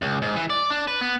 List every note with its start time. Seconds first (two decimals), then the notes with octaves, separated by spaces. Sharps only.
0.02 C#2
0.22 G#2
0.36 E3
0.50 D5
0.70 D4
0.88 B4
1.01 B3